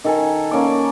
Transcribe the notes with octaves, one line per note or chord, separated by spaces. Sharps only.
D#3 A4 G#5
A#3 C#4 D5 D6